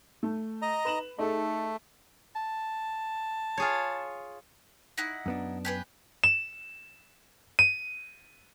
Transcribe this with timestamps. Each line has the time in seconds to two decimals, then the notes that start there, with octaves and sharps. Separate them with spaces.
0.23 A3
0.62 D#5 A#5
0.85 B4 E7 F#7
1.19 A3 D#4 G#4 A4
2.36 A5
3.58 F4 G#4 C#5
4.98 D#4 E4 F#5
5.26 F#2 B3 D4
5.65 G4 G#4 B4
6.24 E7
7.59 D#7